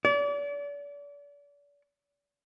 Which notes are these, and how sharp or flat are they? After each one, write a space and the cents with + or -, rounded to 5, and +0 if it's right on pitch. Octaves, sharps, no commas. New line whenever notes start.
D5 -35